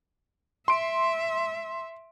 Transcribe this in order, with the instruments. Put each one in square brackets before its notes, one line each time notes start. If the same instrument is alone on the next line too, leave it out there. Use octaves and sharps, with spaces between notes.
[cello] E5 [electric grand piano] C6 D7